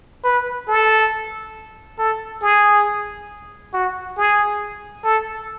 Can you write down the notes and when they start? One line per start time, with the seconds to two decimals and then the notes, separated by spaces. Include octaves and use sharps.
0.24 B4
0.68 A4
1.99 A4
2.42 G#4
3.73 F#4
4.17 G#4
5.04 A4